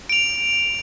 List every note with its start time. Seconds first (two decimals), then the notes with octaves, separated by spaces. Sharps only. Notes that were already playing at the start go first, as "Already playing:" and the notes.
0.09 D7 F7